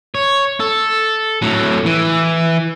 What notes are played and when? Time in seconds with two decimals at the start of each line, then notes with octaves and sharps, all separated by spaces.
0.15 C#5
0.60 A4
1.42 A2 F#3
1.86 E3